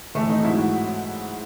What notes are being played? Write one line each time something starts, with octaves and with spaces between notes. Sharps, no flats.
A2 E3 A3
D#4
G#2 F#3 E4
F#4